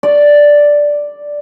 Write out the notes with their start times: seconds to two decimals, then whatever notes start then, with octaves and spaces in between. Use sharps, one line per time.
0.03 D5